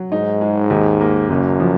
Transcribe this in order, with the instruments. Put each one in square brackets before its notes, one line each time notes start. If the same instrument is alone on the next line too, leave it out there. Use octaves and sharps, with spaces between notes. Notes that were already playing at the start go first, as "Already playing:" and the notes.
Already playing: [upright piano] F#3
[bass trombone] G#2 [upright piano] D#4
[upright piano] G#3
D#2
A#3
[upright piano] F#1 [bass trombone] F#2
[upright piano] F3